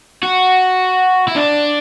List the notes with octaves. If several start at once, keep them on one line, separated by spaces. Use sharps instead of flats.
F#4
E4
D4